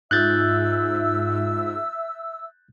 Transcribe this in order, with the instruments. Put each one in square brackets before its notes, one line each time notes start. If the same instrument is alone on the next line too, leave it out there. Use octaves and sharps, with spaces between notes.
[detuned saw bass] G#2 [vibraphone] D#4 F4 [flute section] E5 E6 [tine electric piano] F#6 G6 A6